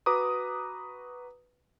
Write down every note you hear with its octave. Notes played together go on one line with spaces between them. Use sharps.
F#4 B4 A#5 D6 D#6